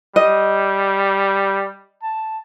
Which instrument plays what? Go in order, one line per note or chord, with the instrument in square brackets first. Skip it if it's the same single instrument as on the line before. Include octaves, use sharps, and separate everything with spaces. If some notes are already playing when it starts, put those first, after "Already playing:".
[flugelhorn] G3 [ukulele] D#5
[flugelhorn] A5